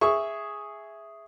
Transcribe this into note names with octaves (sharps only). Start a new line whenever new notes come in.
G#4 E5 C#6